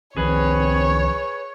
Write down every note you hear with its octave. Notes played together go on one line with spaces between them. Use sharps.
C2 D#3 F3 C4 G#4 B4 C#5